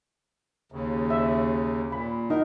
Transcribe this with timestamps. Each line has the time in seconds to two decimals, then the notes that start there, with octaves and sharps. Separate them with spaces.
0.72 D#2 C#3
1.10 E5
1.92 A#2 B5
2.30 D#4 A#4